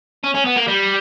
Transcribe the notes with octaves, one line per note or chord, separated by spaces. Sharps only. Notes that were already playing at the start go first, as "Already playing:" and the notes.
C#4
C#4
B3
A#3
G3